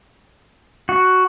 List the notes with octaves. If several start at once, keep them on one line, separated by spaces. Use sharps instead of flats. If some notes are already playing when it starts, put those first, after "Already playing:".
F#4